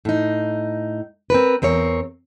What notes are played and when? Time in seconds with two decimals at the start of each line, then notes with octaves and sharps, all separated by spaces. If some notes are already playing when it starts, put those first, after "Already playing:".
0.05 A2 D#4
1.30 C4 A#4 B4
1.62 E2 C4 A#4 C#5